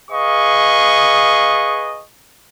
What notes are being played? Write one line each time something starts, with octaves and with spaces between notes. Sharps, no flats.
G#4 B4 D#5 F5 C#6